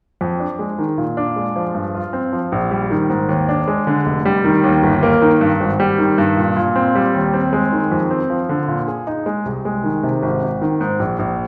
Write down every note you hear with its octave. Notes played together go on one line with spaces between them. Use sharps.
F2
D4
G#3
D#3
A#2
D4
G#3
F3
G2
F4
C4
F3
A#1
G3
D#3
G#2
D#2
D4
G#3
D3
F1
G3
D#3
D#2
G1
A#3
D#3
G2
G#1
G3
D#3
G2
A#2
A#2
C4
G3
D#2
C4
G#3
D#3
F2
C4
F3
D3
A#2
G#4
D#4
G#3
C2
G#3
D#3
C3
G#1
G#1
D#3
G#2
A#1
A#1